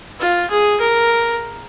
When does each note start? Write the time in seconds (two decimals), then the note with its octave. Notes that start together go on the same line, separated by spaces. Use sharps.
0.20 F4
0.50 G#4
0.80 A#4